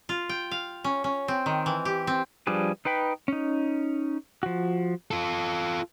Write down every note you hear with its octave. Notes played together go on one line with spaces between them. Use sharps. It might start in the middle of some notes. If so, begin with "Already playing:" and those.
F4
G5
F5
C#4
C#4
C4
D#3
E3
G4
C4
F3 G3 D4 G#4 B4
D#4 B4 G5 B5
C#4 D#4
F3 F#4
F4 A4